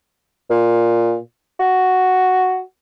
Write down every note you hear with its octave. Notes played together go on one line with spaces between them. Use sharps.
A#2
F#4